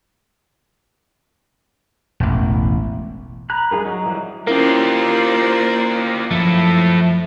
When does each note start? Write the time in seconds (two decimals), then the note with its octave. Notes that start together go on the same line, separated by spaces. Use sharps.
2.20 E1 A1
3.50 A#5 B5 F#6
3.71 G3 G#3 F4 G#4 A#4
3.85 F#3 D#4
4.06 E3 F3 G3
4.47 A#3 C#4 E4 F4 G4 A#4 C5 D5
6.31 F#2 F3 A3 E4